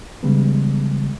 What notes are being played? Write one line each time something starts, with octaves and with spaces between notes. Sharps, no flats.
C#3 E3 G3 G#3 B3